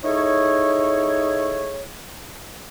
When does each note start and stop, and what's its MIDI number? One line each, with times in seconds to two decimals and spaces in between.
0.04 1.84 63
0.04 1.84 64
0.04 1.84 68
0.04 1.84 69
0.04 1.84 73